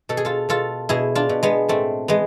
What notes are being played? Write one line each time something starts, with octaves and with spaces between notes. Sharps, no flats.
B2 A4
G#4
F4 A4
B2 F4 A4
B2 E4 G#4
D4 F4
B2
G#3 B3
A2 A3 C4
E3 G#3 B3